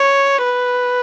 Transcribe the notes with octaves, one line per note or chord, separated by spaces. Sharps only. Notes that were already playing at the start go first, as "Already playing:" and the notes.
Already playing: C#5
B4